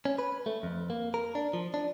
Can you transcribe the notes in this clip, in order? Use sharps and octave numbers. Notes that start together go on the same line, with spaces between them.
C#4
B4
A3
F2
A#3
A#4
D4
F3
D4